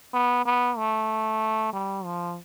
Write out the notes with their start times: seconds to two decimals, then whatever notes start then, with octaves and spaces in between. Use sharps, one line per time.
0.13 B3
0.45 B3
0.77 A3
1.73 G3
2.05 F3